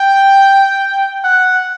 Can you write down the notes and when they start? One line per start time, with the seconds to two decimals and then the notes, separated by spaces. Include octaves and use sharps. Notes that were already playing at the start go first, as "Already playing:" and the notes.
Already playing: G5
1.24 F#5